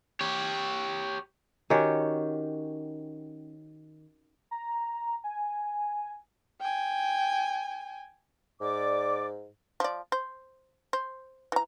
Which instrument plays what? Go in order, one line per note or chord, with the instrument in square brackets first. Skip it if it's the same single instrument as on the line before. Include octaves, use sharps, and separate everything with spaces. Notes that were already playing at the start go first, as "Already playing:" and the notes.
[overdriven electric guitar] G4 C#5
[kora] D#3 C#4 F#4 G4
[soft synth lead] A#5
G#5
[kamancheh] G5 G#5
[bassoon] G#2 [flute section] D5 D6
[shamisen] F3 D5
C5
C5
E3 A#5